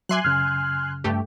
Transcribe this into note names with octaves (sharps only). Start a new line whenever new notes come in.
F#3 E5 G#5 C6 D6 F#6
F#2 C#3 F6
G2 A3 G4